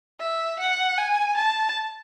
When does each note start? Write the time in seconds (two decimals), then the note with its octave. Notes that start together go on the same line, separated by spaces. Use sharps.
0.20 E5
0.59 F#5
0.98 G#5
1.37 A5